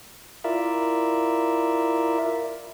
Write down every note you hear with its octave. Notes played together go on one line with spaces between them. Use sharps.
E4 F4 A#4 D5 E5